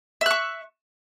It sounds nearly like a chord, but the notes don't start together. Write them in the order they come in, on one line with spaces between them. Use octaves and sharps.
E5 F#6 C#6